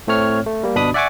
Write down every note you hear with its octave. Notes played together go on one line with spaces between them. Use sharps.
A2 A3 C4 C#5 F6
A3
G3 A#3
G1 B2 D4 B5 D#6
D5 E5 F#5 G#5 C#6 D6